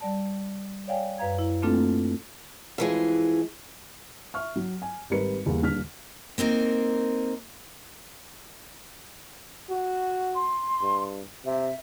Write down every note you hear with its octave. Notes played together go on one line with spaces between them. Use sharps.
G3 D5 A5
C#5 D5 F5 G5 G#5
F#2 B4 F5 A#5 G#6
E4
A3 A#3 C4 D4 F4 A4
F2 E3 G#3
E5 C#6 F6
F#3
G#5
G#1 G3 A#4 B4 C#7
E2 G3 A#3
D#1 D3 F6 B6
A#3 C4 D#4 A#4
F#4
C6
G2
C3 E5